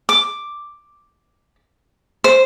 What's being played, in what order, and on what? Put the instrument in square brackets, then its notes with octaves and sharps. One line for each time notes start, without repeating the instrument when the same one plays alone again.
[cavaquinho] D6
C5